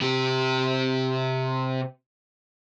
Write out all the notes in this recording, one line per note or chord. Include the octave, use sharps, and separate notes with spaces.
C3 G4